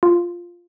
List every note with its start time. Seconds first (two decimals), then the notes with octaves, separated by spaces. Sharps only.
0.03 F4